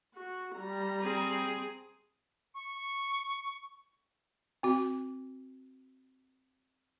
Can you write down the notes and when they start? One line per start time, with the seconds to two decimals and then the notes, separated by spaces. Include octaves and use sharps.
0.15 F#4
0.56 G3 A#5
1.02 C4 G#4
2.55 C#6
4.63 C4 F#4